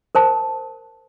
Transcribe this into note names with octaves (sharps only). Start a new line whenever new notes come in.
A#4 C5 A5